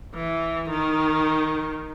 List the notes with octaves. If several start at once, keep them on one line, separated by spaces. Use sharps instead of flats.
E3
D#3